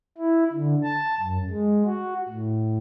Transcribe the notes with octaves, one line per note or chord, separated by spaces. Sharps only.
E4
D3
A5
F#2
G#3
F#4
A2